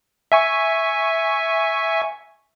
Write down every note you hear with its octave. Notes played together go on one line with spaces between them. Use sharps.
E5 G#5 C#6